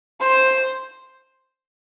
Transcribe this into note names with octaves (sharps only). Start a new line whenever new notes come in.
C5